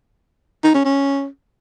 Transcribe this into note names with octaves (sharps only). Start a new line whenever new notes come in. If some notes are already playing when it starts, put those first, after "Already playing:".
D#4
C#4
C#4